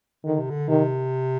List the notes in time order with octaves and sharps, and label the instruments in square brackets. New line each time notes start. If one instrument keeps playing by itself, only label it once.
[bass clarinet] D3 [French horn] D#3
[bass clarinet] C3
D3
[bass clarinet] C3 [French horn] D#3